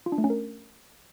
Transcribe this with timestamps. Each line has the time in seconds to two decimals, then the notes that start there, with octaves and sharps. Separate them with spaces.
0.06 F4
0.12 D4
0.18 A3
0.24 C#4
0.30 A#4